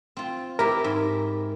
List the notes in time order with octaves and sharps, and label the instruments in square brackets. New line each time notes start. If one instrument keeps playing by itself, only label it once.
[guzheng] C4 F4
[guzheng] E4 G4 [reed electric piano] A#4
[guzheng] G#2